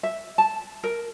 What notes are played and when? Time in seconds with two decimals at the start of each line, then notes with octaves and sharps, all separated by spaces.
0.03 E5
0.38 A5
0.84 A#4